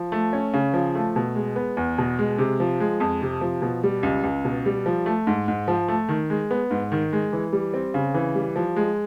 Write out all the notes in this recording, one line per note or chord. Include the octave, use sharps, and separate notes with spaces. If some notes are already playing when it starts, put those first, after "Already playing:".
Already playing: F3
A3
C#4
C#3
F3
A3
B2
G#3
B3
E2
B2
G#3
C3
F3
G#3
F2
C3
F3
B2
G3
C#2
C#2
B2
G3
F3
A3
G#2
G#2
F3
A3
D#3
G#3
B3
G#2
D#3
G#3
E3
G3
C4
C#3
E3
G3
F3
G#3